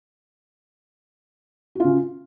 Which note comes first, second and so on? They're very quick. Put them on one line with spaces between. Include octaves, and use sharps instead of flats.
F#4 F4 C#3